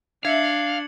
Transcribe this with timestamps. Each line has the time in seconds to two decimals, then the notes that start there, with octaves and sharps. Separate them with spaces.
0.25 D4 E5 F5 G#6 C#7 F#7